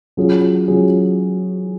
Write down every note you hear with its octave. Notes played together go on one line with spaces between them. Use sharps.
F#3 C#4 F4 G#4
F#3 C#4 F4 G#4